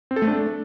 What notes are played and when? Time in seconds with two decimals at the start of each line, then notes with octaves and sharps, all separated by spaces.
0.11 C4
0.16 A4
0.22 A3
0.28 D4